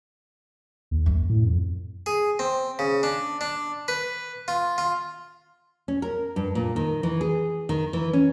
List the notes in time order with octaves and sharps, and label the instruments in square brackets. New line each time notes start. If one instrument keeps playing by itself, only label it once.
[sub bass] D#2
[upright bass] F#2
[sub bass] A2
F2
[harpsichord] G#4
C4
C#3
D4
D4
B4
F4
F4
[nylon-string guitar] C#4
A#4
G2
A#2
D#3
E3
G#4
D#3
E3
C#4